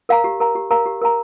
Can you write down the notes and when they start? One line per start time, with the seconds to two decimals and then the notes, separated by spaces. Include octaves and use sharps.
0.09 A#4 F5 A#5
0.24 G4
0.40 A#4 F5 A#5
0.55 G4
0.71 A#4 F5 A#5
0.86 G4
1.01 A#4 F5 A#5